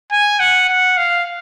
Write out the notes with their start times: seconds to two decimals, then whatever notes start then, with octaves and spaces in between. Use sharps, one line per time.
0.12 G#5
0.40 F#5
0.69 F#5
0.97 F5